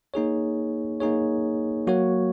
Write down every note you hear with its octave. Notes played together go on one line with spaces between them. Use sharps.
A#3 D#4 G#4 C#5
A#3 D#4 G#4 C#5
F#3 A#3 F#4 C#5